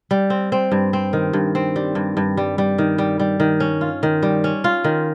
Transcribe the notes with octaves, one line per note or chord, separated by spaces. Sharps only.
G3
C4
C4
G2
C4
D#3
G2
C4
G3
G2
G2
G3
G3
D#3
G3
G3
D#3
C#4
F4
D#3
G3
C#4
F4
D#3